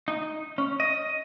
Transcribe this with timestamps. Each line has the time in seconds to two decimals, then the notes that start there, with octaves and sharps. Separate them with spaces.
0.08 D#4
0.58 C#4
0.80 D#5